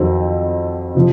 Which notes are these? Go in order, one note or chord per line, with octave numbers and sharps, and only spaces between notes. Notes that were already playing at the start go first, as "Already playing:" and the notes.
Already playing: F2 D#3 F#3 C4
C3 F3